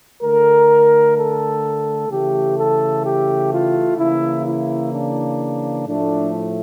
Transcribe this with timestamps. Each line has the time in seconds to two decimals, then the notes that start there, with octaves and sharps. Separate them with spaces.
0.22 D3 A3 A#4
1.16 A4
2.10 C#3 E3 A3 G4
2.57 A4
3.04 G4
3.52 F4
3.98 C#3 E3 A#3 E4
4.45 E4
4.92 D4
5.87 A2 F3 A3 D4